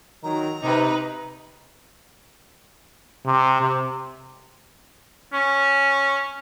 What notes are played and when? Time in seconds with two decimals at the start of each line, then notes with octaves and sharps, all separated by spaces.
0.23 D#3 F#3 A#5
0.62 C3 D#4 B4
3.26 C3
3.61 C3
5.33 C#4